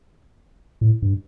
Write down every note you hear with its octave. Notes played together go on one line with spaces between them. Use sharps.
A2
G2